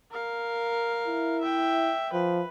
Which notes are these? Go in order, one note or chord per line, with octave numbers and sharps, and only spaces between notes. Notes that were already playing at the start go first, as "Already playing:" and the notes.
A#4 F5
E4
E5 G5
F3 B4